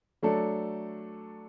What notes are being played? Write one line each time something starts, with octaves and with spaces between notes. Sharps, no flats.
F#3 A3 D4 A4